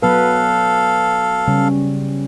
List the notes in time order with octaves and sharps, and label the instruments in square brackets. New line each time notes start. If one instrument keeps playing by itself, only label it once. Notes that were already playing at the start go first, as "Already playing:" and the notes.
[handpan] F#3 B3 B4 [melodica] A4 F5
[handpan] C#3 G3 C#4